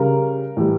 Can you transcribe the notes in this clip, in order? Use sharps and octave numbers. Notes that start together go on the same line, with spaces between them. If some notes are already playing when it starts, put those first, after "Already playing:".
Already playing: C#3 G3 A#4
A2 E3 G3